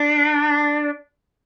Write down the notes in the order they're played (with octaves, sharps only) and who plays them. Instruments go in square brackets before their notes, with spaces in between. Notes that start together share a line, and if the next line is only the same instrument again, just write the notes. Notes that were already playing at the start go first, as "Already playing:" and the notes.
Already playing: [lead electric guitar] D4